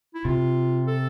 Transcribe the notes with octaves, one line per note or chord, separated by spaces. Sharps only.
E4
C3 F4
A4